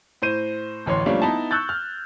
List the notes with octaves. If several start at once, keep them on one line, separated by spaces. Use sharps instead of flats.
A2 C5 D#7
D1 A1 C#5 C6
F3 G3 A3 A#3 C#4 D4
B3 D#4 E4 A5
C#6 E6 F#6 G6 A6
F6